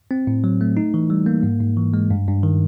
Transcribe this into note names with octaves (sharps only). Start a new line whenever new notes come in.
C4
A2
F#3
A3
D#4
E3
G3
A#3
G#2
G#2
E3
G#3
G2
G2
D#3